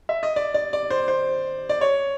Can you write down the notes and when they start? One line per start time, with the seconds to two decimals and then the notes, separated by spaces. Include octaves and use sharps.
0.09 E5
0.23 D#5
0.36 D5
0.54 D5
0.73 D5
0.90 C5
1.08 C5
1.69 D5
1.81 C#5